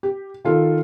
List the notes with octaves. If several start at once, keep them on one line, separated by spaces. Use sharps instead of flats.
G4
D#3 F4 A4